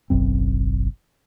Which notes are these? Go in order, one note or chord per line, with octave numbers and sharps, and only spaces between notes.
F#1 B1 F#2 C4